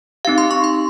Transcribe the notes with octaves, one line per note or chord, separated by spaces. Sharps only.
C4 D#4 G4 F5
C6
C#6
C6